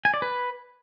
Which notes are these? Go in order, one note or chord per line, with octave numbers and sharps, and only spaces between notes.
G#5
D5
B4